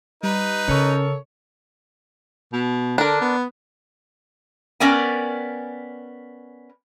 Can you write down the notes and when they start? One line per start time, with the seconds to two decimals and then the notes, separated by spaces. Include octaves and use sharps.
0.23 G3 D#4 B4
0.68 C#3 C#4 A4 A#4 C#5
2.53 B2
2.98 D3 D4 A#4
3.21 B3
4.80 B3 C#4 A#4 D5 G5 G#5